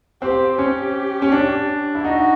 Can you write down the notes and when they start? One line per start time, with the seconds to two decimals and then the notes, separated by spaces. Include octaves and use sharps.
0.22 C4 G4
0.58 C#4 G4
1.22 C#4
1.32 D4
1.95 E4
2.04 D#4 F#4